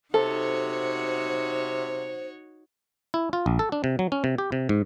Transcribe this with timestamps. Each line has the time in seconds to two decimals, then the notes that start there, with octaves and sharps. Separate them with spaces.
0.14 C3 D#4 F#4 A4 C5 C#5
3.14 E4
3.33 F4
3.46 A#1
3.59 A4
3.72 D4
3.84 C3
3.99 F#3
4.12 C#4
4.24 C3
4.38 G4
4.52 C3
4.69 G#2